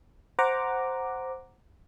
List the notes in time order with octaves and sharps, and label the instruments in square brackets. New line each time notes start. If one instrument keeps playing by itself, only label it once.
[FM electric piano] C5 F#5 A#5 D6